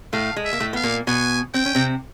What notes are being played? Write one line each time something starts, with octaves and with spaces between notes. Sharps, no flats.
A2 A3 F5
G#3
E5
A#3
A2 A3
B3 F5
A#2 A#3
B2 B3 G#5
C4 G5
C#4
C3 C4